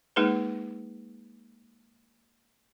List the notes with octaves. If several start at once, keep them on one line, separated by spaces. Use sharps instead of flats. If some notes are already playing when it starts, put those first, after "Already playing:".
G#3 A#3 D#4 G#4 B4